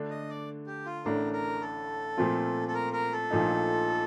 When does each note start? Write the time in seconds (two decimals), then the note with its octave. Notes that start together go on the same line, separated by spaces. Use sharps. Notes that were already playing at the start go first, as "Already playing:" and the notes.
Already playing: D3 A3 D4
0.10 D#5
0.29 D5
0.67 G4
0.85 F4
1.04 A1 A2 A3 D4 A#4
1.33 A#4
1.62 A4
2.17 A#2 F3 A3 C4 F4
2.68 A4
2.74 A#4
2.93 A#4
3.12 A4
3.31 A#1 A#2 F3 A3 D#4